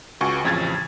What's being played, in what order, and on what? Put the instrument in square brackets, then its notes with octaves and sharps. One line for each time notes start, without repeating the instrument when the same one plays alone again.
[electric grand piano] C#2 F#4 G#5 C#6
A1 F2 C#3 G#6 A6